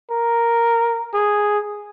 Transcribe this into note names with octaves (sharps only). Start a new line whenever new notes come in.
A#4
G#4